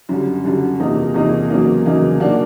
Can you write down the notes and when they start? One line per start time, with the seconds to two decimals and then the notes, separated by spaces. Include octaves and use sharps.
0.09 F#2 D3 G3
0.44 F#2 D3 G3
0.80 E2 C3 F3 A#3 D#4
1.14 E2 C3 F3 A#3 D#4
1.50 E2 C#3 F#3 A#3 D#4
1.86 E2 C#3 F#3 A#3 D#4
2.20 D#3 F#3 A#3 D4 F#4